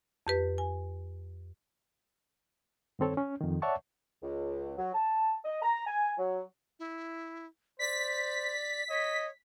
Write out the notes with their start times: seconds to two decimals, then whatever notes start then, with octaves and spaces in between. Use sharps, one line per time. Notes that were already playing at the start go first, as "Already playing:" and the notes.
0.27 F2 G4 B4
0.58 G#5
2.99 G2 D#3 C4 A4 C#5
3.17 C#4
3.40 F2 D#3
3.62 C#5 D5 E5 F#5 A5 C#6
4.22 C#2
4.78 F#3
4.93 A5
5.45 D#5
5.62 A#5
5.86 G#5
6.18 F#3
6.79 E4
7.79 C5 D5 B6
8.89 C#5 D#5